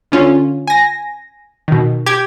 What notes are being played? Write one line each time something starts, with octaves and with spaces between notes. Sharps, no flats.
D3 C#4 F4
G#5 A#6
B2 D#3
G4 G#6